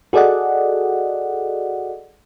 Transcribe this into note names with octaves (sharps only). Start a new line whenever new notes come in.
F#4 G#4 A4 D5 D#5 F#5